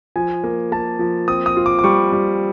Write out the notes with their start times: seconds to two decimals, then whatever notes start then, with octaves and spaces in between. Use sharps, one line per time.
0.16 F3 G#5
0.44 A#3
0.72 A#3 A5
0.99 F3
1.28 C4 D#6
1.46 D#6
1.57 F4
1.66 D6
1.79 D6
1.84 G3 C#6
2.12 G3